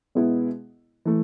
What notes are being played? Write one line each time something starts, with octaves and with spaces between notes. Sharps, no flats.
B2 G#3 B3 E4
E3 A3